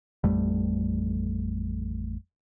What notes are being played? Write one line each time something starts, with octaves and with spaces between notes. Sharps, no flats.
A1 F2 G3 A3